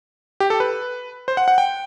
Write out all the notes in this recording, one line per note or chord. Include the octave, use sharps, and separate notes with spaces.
G4
A4
B4
C5
F#5
F#5
G5